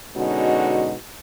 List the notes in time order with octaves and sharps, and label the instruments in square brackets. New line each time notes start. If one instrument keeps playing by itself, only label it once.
[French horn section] B2 D3 G#3 C#4 D#4 F#4